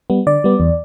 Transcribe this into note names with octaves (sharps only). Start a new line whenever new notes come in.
G3 B3
D3 D5
G3 B3
E2